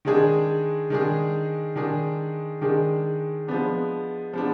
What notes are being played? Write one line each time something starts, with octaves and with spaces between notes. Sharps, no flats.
D#3 G#3 D4 G#4
D#3 G#3 D4 G#4
D#3 G#3 D4 G#4
D#3 G#3 D4 G#4
F3 G#3 B3 D4
F3 G#3 B3 D4